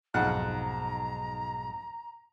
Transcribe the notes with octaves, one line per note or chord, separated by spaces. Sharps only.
B1 F2 G#2 G#3 F#5 A#5 F#6